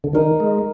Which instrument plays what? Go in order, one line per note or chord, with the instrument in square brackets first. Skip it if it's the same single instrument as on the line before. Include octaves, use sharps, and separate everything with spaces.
[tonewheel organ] D3
[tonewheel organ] D#3 [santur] D#4 A#4 D#5
[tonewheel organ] G#3